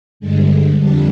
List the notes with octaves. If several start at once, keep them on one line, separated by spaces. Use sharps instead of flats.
G2 D3 G#3
F2 D3 G3 D4